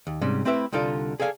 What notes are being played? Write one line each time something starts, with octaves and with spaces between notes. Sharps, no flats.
D#2
G#2 C3 G3 C#4
A3 C4 E4 G4 B4 E5
C2 D3 D#4 F4 A4 D5
G#4 A4 D5 F5 G#5